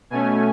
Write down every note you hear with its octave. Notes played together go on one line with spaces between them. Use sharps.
B2 A3 C#4 G#5